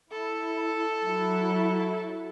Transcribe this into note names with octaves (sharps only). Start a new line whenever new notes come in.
E4 A4
F#3 E4